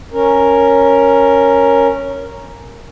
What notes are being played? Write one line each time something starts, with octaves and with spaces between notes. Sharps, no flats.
C#4 A#4